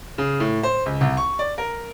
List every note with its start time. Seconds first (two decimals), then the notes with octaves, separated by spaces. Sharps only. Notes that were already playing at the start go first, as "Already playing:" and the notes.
0.18 C#3
0.40 A2
0.63 C5
0.86 C#2
1.01 C2
1.17 C#6
1.39 D5
1.58 A#4